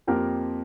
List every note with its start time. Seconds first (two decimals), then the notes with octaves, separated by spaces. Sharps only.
0.07 F2 F3 A#3 G4 A#4